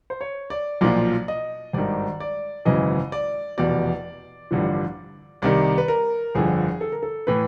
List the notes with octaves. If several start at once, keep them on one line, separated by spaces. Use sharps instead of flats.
C5
C#5
D5
B1 A#2 F3 D5
D#5
G#1 G2 D#3 D5
D5
G#1 F#2 C#3 E3 D#5
D5
F1 E2 B2 D5
A1 G2 D3 F3
C2 C3 D#3 D5
B4
A#4
G1 F2 D3 F3 G#4
A4
A#4
A4
A2 E3 B4